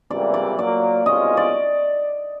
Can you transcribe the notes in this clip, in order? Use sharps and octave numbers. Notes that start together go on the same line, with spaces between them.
C#2 C3 E3 G3 A#3 D5
D5
A#2 F#3 A#3 D5
C2 B2 G#3 C#4 F4 D#5
D5